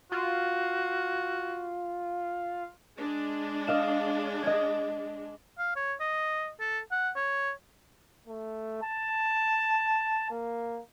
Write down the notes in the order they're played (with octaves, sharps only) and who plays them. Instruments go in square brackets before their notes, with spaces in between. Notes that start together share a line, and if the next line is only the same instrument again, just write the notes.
[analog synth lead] F4 [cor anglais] F#4
[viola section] G#3 D4
[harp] D#5 F5 E7
D#5 G#6
[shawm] F5
C#5
D#5
A4
F#5
C#5
[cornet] A3
A5
A#3